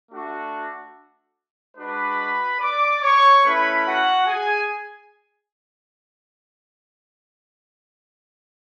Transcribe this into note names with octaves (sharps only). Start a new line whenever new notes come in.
A3 D4 F#4
G#3 D4 F#4 B4 B5
D5 D6
C#5 C#6
A3 C#4 E4 B4 B5
F#4 F#5
G#4 G#5